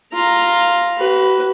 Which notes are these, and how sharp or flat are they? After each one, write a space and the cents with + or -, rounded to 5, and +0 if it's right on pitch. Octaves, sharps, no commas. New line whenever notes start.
F4 +0 A#5 +0
F#4 +45 B4 +0